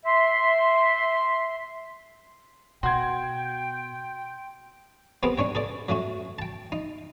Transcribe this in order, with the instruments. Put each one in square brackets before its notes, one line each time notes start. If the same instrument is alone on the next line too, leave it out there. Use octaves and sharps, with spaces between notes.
[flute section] E5 C6
[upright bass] B2 [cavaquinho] F#4 [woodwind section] G5 [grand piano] C6 G#6
[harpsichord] B3 C4 G4 G#4 A#4 G5
C#4 D4 C#5 G5
G#4 A4 D5
F#3 A3 C#4 F#4
G5 A5
D#4